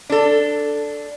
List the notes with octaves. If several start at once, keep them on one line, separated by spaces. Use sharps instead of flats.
D4 A4